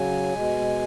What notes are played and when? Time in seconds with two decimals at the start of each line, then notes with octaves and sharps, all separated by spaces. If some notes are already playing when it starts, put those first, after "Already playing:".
Already playing: C#3 F#3 G#5
0.34 B2 G#3